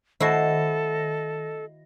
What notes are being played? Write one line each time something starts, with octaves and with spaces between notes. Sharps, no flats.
D#3 E4 F#4 A4 D#5 A#6